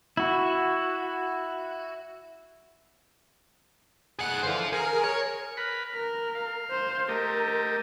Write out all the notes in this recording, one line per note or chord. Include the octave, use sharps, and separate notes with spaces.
E4 F#4
G#4 F#5 F#6
D3 E3 C5 F5
G#4 A#4
C#5
A#4 B4 B5
A#4 F6
F5
C5
A3 G4 A#4 D#5